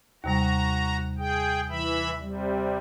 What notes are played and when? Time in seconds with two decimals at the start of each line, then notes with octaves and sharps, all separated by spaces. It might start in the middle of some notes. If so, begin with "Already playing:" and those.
0.24 D#2 C3 G3 F#4 A#5
1.19 G#4 G5
1.69 E3 E5 B5
2.20 C3 G3